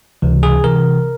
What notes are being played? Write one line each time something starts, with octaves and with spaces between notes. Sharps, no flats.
C#2 C3 E3
G#4
C3 E3 A#4